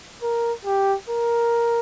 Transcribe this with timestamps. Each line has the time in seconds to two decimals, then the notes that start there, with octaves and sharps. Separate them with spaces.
0.23 A#4
0.65 G4
1.08 A#4